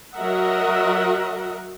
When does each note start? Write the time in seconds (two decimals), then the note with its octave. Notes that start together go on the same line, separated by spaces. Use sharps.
0.15 F#3 F#4 A#4 D#5 E5 F#5